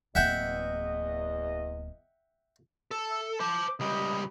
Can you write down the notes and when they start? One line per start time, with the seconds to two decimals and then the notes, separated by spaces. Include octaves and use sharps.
0.15 D1 E2 A#3 D#5 E5 F#5 G5
2.91 A4
3.10 E5
3.40 C5 A5 D6
3.80 C#2 G3 D#5